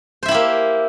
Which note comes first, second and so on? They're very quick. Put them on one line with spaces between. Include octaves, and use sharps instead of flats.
C5 E5 E4 G4 A#3